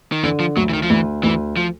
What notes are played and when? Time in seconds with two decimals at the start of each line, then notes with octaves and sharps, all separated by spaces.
0.12 D#3
0.23 D3 E3
0.40 F3
0.57 D2 F#3
0.69 E3
0.74 D#3
0.83 F3
0.90 D2 E3
1.23 D2 E3
1.56 F3